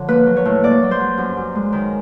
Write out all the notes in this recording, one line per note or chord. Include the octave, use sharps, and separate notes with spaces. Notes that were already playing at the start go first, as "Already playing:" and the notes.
Already playing: D3 F3 C#5
A#3 B4
F#3
C#5
A2
A#3 D5
F#3
C5
F#3
F#2
F#2
G#3
D#3